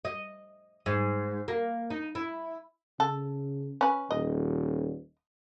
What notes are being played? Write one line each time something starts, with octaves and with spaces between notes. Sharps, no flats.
D#5
G#2
A#3
D#4
E4
C#3 A4
C#4 B4
D#1 D#5